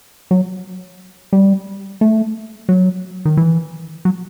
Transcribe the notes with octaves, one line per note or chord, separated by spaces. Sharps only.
F#3
G3
A3
F#3
D#3
E3
F#3